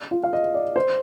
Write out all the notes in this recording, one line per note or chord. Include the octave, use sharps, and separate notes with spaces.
F4
F5
D#5
D5
C5